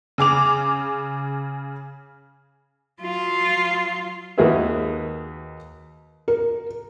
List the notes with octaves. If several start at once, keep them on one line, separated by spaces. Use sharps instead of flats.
C#3 G#4 D6 F7
F#3 F4
D#2 A#3 F#4 G#4 B4 E5
A#4